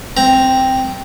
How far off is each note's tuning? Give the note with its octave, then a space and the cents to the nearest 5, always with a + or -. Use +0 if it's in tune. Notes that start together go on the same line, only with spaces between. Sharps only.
C4 +0 A#5 +0